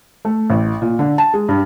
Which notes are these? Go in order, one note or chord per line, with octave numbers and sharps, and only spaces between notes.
A3
A1
A#2
D3
A5
G#3
G2